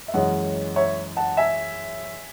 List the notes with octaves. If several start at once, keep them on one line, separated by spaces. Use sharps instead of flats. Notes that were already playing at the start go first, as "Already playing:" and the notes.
E5
F#2 E3 G#3 C#4 D#5 F#5
C#5 E5
F#5 A5
E5 G#5